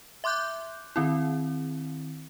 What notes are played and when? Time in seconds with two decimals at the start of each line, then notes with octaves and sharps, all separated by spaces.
0.24 E5 C6 D6 F#6 G6
0.96 D#3 C4 E4